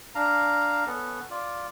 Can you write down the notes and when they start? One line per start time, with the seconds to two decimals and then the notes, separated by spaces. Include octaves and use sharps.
0.15 D4 F5 A#5
0.87 B3 C#4 A4
1.30 F4 D5